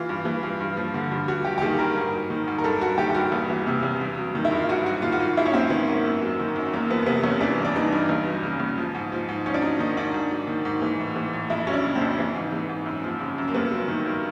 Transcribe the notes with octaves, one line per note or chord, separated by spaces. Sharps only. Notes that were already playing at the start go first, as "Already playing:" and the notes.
Already playing: E3 F4
G2
E3
G2
G2
F3
D3
G2
G2 F#4
F#3 G4
G4
D#3 G#4
G2 A#4
G#2
F#3
D#3
G#2
A#4
G2 A4
F#3 F#4
D#3 G4
G4
G2 F#4
E2
E3
C3
E2
G2
F#3
D#3
E4
G2
F4
G#2 F#4
F#3 F#4
D#3 F4
F#4
G#2 F4
G#2 E4
C#4
F#3 C4
D#3 B3
G#2 A#3
F#2
F#3
D#3
F#2
E2 A#3
F3 B3
C3 B3
E2 C#4
E3 D4
G2
D4
E3 D#4
G2
E2
F#3
C#3
E2
F3
G#2
F3
G#2
G#2 C#4
D4
F#3 D#4
D#3 D#4
G#2 D4
G#2
F#3
D#3
G#2
E3
A2
E3
A2
F2 E4
F#3 C#4
D4
C#3
C4
F2
E3
G#2
E3
G#2
F#2
F3
C#3
F#2
A#3
G2 B3
F#3
D#3
G2